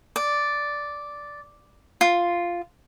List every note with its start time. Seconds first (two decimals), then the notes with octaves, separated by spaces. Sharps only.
0.16 D5
2.01 F4